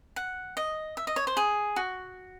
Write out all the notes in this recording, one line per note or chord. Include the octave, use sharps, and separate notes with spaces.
F#5
D#5
E5
D#5
C#5
C5
G#4
F#4